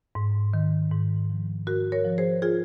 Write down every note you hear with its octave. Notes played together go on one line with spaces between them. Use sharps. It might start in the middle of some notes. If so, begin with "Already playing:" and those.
G#2
D#3
G#2
F3
G#2 F#4 A#4
A#4 C#5
F3
G#4 C5
F4 G#4